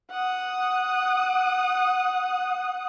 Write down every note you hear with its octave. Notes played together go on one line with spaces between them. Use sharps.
F#5 D#6